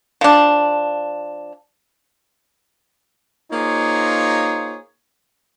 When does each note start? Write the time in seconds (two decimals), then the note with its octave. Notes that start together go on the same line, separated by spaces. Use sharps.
0.21 F3 D4
3.52 A#3 D#4 F4 G#4 C5 C#5